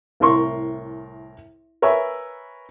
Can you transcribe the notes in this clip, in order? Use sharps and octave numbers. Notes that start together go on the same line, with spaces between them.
C2 A2 A#4 C6 C#6
A#4 B4 C#5 E5 G#5 E6